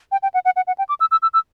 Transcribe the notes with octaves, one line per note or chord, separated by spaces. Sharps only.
G5
G5
F#5
F#5
F#5
F#5
G5
D6
E6
E6
E6
E6